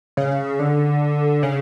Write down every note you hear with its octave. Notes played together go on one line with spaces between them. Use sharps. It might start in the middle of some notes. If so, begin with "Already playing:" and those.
C#3
D3
C#3